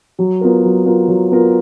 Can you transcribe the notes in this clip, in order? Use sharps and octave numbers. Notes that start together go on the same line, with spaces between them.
F#3
B3 F4 A#4
F#3
B3 F4 A#4
F#3
B3 F4 A#4